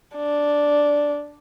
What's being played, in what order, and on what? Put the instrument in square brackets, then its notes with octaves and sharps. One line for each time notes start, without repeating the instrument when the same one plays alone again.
[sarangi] D4